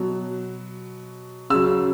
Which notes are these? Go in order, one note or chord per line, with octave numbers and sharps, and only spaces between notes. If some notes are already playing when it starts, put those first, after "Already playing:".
Already playing: B2 F#3
C#3 F#3 E6